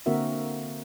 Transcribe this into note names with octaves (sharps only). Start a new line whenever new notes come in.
D3 A#3 C4 F#4 A#4 E5